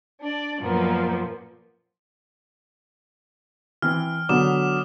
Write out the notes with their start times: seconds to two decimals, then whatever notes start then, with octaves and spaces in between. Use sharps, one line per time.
0.21 D4 D5
0.61 F#2 A#2 F3 A#3 B3
3.82 E3 C4 F6
4.29 D3 F#3 B3 D6 D#6 E7